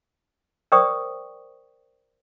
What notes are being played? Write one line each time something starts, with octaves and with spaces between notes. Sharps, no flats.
A#4 C5 D5 G5 C#6 D#6